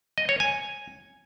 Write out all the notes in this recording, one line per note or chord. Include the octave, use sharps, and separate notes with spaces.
D#5
C#5
G#5